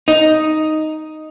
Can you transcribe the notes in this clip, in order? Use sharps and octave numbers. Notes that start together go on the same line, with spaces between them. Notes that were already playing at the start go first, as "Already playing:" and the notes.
D#4